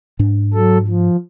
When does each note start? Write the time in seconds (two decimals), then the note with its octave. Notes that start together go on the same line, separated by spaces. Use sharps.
0.19 G#2 D4
0.54 F#3 A4
0.87 F3